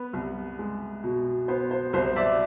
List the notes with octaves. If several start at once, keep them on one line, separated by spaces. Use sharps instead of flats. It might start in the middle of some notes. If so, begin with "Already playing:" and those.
Already playing: B3 B4
C2
G#3
B2
B3 C5
C5
C2 C5
D5 E5